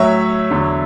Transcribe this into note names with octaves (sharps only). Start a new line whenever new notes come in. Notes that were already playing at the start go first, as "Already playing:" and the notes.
Already playing: A2 F#3 C#5 E5
E2 D3 F#3